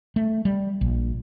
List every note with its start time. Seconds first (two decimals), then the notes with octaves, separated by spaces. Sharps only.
0.16 A3
0.45 G3
0.81 A#1